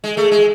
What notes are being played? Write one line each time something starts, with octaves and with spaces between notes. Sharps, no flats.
G#3
A3
G#3